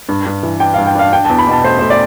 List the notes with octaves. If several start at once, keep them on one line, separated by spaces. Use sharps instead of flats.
G2
G2
E3
D4 G5
F5
G2
G5
D4 F5
D4 G5
A5
E2
B5
B2 A5
A3 C5
A3 C5
D5